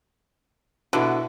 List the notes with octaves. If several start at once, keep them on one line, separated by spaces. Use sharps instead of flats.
B2 D3 E4 B4